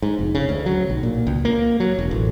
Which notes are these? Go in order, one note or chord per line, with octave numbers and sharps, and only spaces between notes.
G#2
F1
C#3
D2
F#3
B1
A#2
C#2
A#3
F#3
E1
A1